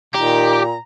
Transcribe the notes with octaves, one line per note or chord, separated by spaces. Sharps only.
A#2 D#3 G4 A#5